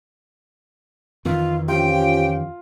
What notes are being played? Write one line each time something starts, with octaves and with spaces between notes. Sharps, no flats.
F2 D#3 E3 F4
F3 C#4 F4 G4 G5